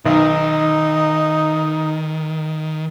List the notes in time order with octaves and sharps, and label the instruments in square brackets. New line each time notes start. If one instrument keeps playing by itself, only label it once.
[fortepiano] B1 [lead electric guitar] D#3 [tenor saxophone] D#4